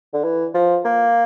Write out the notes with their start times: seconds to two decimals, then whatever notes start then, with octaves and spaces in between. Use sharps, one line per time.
0.13 D3
0.24 E3
0.54 F3
0.85 A#3